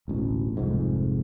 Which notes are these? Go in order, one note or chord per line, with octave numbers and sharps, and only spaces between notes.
E1 A1 D2
F1 C2 F2 G#2